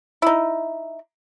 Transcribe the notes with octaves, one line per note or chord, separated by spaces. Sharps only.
D#4 E4